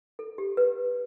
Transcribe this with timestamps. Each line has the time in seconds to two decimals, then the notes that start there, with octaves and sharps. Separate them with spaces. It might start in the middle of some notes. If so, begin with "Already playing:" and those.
0.19 A4
0.38 G4
0.57 B4